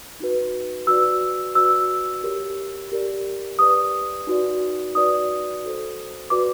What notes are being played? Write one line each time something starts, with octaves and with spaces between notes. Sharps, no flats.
D#4 F#4 B4
F#4 B4 D5 E6
F#4 B4 D5 E6
G4 A#4 C#5
G4 A#4 D5
G4 B4 D5 D#6
D#4 F#4 B4 D5
D#4 F#4 B4 D5 D#6
F#4 A4 C5
F#4 B4 D5 D6